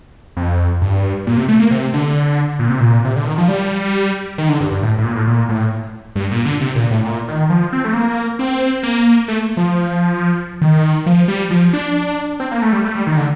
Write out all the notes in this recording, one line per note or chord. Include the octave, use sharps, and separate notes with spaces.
F2
G2
A#2
C3
A3
A#3
C3
D3
A#2
C3
A#2
C3
D3
D#3
F3
G3
D#3
D3
G2
G2
A2
A2
A#2
A2
A#2
A2
G2
A#2
D3
C3
A#2
A2
A#2
D#3
F3
C4
A3
A#3
C4
A#3
A3
F3
D#3
F3
G3
F3
D4
C4
A#3
A3
G3
A3
G3
D#3
D3